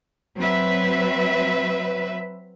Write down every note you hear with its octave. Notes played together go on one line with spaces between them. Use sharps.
F#3 C4 B4 E5